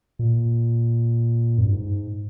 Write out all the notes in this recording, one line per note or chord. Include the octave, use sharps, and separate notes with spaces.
A#2
F#2
G2
G#2